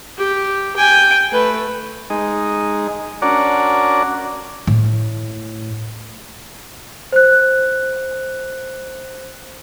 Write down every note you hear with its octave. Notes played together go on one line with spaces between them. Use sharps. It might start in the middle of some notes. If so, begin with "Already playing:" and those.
G4
G5 G#5
A3 B4
G#3 D#4
C#4 D4 F#4 A#4 D5
A2
C5 F#6